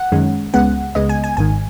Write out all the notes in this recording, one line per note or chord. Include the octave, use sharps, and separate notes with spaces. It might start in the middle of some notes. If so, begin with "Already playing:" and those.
Already playing: F#5
F#2 D#3 G#3 C#4
C#2 C#3 G#3 B3 F#5
C#2 C#3 G#3 B3 D#5
G#5
G#5
G#1 G#2 D#3 G#5